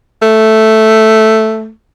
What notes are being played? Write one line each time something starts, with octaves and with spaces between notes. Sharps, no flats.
A3